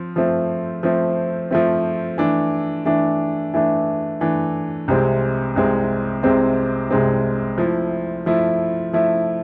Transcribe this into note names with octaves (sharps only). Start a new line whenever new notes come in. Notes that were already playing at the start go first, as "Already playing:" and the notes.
Already playing: F3 C4
F3 A3 C4
F3 A3 C4
F3 A3 C4
E3 A3 D4
E3 A3 D4
E3 A3 D4
E3 A3 D4
C2 C3 G#3 C4
C2 C3 G#3 C4
C2 C3 G#3 C4
C2 C3 G#3 C4
F3 A3 E4
F3 A3 E4
F3 A3 E4